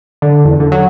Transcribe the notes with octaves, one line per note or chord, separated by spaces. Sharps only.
D3
E2
D3
F#3